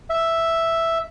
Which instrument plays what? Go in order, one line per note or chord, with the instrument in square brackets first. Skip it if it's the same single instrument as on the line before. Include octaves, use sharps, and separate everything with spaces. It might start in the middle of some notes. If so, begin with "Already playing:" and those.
[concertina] E5